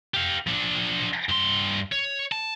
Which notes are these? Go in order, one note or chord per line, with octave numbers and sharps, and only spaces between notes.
G4 F5
F3 D4
G2 C6
C#5
A5